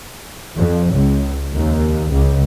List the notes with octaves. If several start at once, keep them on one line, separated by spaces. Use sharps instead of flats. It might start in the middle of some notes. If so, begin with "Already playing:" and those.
F2
C#2
D#2
C#2